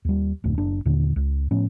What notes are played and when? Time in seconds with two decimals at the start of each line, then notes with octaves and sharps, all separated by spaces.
0.05 D#2 G3
0.44 F1 D2 A2
0.58 F#1 D4
0.85 D#2 A#2 D3
1.16 C#2
1.51 A2 F3 B3 C#4